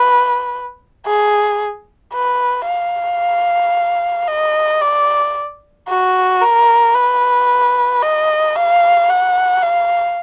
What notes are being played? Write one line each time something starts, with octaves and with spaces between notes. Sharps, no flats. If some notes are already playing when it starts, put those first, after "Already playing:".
Already playing: B4
G#4
B4
F5
D#5
D5
F#4
A#4
B4
D#5
F5
F#5
F5